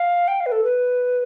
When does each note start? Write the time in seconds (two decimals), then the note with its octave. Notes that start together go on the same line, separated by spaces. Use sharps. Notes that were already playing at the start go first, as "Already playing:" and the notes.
Already playing: F5
0.28 G5
0.40 F5
0.46 B4
0.52 A4
0.64 B4